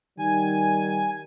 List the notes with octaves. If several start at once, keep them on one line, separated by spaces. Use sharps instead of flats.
D#3 G3 G#5